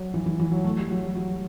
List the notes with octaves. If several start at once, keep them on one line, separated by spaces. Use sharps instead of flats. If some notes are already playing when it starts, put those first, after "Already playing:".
Already playing: F#3
E3
E3
E3
F#3
A3
G3
F#3
G3
F#3